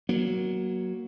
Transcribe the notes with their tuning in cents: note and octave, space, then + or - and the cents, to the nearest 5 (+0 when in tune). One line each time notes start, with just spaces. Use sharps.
F#3 +0 A#3 +20